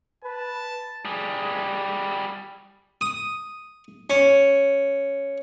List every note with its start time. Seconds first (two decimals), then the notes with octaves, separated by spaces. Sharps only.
0.24 B4 A5
1.05 G3 G#4
3.01 D#6
4.10 C#4